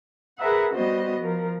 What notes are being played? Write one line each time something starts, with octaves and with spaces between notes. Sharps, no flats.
G#4 A#4 B4 E5 F#5
G3 B3 F#4 C5 D#5
F3 A#4